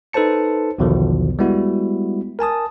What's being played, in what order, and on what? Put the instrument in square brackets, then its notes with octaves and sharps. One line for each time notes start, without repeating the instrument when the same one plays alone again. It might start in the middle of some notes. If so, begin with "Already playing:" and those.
[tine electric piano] D#4 A4 B4 C5 A5 C#7
B1 E2 B2 D3 D#3 F3
G3 G#3 B3 E4 F#4
A#4 G#5 A5 D#6